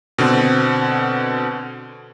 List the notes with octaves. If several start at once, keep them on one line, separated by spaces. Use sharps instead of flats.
B2 D3 C4